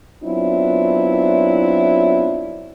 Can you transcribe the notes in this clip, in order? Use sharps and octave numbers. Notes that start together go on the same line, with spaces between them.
F#3 B3 C4 D4 E4 F4